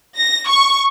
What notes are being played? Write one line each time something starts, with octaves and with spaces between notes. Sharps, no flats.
A#6
C#6